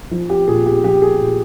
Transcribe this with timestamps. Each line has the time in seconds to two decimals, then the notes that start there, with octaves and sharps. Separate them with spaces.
0.11 F3
0.30 G4
0.48 A#2 G#4
0.66 G4
0.84 F3 G4
1.02 G#4
1.21 A#2